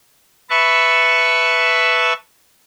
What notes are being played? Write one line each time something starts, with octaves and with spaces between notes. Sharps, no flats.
B4 E5 A5 C#6